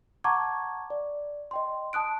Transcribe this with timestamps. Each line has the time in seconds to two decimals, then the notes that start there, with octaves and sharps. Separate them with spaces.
0.24 F#5 A5 A#5 C#6 D6 G#6
0.90 D5
1.51 D#5 G5 C6
1.93 A5 D#6 F#6 D7